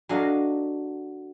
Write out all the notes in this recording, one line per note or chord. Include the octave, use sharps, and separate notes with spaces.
F#3 D4 A4 D#5 F5